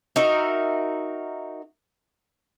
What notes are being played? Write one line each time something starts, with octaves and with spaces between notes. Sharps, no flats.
D#4 F#4 A#4 E5